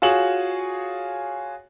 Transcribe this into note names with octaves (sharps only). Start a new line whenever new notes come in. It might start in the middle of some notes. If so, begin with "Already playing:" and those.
F4 F#4 G#4 C#5 E7 F#7